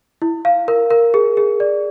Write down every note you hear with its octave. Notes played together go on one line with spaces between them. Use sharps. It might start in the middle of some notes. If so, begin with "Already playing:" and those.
E4
F5
A#4
A#4
G#4
G#4
D5